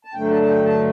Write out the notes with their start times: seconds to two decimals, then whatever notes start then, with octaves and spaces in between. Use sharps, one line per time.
0.05 A5
0.14 G2 D3 F#3 A3 G5
0.30 A5
0.42 A5
0.48 G5
0.65 A5